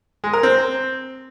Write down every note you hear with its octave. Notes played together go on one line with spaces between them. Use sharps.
G#3
A#4
C4